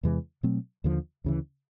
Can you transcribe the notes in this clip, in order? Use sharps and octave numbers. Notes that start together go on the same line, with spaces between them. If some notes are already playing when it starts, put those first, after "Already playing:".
E2 C3 E3 G#3
B2 F#3 A3 C4
D#2 D3 F3
D2 C#3 E3